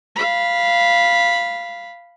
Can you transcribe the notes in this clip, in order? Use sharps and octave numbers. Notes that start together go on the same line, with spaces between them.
F5 B5